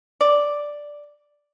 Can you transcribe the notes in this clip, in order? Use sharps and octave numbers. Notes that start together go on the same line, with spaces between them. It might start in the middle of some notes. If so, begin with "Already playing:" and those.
D5